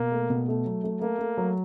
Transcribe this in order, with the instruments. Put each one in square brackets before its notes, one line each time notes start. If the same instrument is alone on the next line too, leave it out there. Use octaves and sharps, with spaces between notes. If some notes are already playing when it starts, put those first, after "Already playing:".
Already playing: [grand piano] B2 [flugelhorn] A#3
[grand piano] A3
B2
A3
F#3
A3
[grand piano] A3 [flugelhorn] A#3
[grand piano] A3
F#3